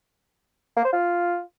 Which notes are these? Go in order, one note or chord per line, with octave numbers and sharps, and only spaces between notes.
A#3
C5
F4